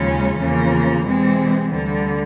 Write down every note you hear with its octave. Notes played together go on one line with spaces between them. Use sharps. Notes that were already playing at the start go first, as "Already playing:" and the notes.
Already playing: D#2 C#3 F3 G#3 C#4
E2 C#3 F3 A#3
C3 E3 G#3 C4
D2 D3 G3